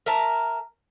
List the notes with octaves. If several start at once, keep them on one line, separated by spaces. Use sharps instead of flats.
A#4 E5 A5 A#5